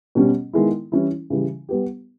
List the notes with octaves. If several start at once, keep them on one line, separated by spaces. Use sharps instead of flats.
B2 G3 C#4
D#3 G#3 B3 E4
E3 G3 C#4 E4
C#3 E3 G3
G3 B3 G4